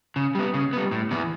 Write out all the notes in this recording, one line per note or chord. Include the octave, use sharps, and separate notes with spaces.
C#3
G3 B3
C#3
G3 B3
A2
E3 B3